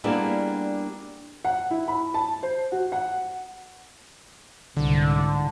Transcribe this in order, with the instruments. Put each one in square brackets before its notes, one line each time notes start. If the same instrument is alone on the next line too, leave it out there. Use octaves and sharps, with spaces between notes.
[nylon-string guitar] G3 A#3 B3 D4 E4 G#4
[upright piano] F#5
E4
B5
A5
C5
F#4
F#5
[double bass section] C2 G#2 [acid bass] D3